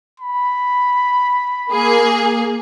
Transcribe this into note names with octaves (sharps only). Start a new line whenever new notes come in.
B5
A#3 G#4